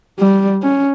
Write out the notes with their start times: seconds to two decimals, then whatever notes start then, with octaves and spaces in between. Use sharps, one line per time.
0.19 G3
0.62 C#4